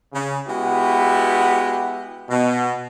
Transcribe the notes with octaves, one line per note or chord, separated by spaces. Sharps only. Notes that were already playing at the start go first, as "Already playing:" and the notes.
C#3
G#3 B3 E4 F#4 G4
B2